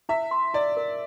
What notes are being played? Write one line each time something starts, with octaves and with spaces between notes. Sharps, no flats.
E4 E5
C6
E4 D5
A#4